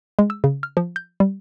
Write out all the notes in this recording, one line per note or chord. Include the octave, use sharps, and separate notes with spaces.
G#3
E6
C#3
F6
F3
G6
G3